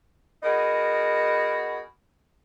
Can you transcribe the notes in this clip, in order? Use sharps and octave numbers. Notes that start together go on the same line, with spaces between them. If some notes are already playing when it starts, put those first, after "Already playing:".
B3 D#4 F#4 G#4 A#4